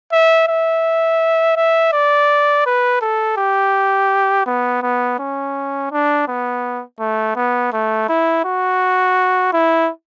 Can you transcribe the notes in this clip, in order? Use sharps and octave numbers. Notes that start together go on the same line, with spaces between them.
E5
E5
E5
D5
B4
A4
G4
B3
B3
C#4
D4
B3
A3
B3
A3
E4
F#4
E4